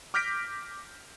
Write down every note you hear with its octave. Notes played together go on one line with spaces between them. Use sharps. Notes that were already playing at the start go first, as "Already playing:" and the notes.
D6 F6 G6 A#6 B6 D7